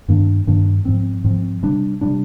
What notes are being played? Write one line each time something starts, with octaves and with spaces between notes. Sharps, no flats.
G2 D#3 A#3 D4
G2 D#3 A#3 D4
G#2 F3 C4
G#2 F3 C4
C3 G3 D4
C3 G3 D4